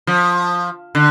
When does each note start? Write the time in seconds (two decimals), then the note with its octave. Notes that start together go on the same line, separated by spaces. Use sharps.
0.07 F3
0.95 D3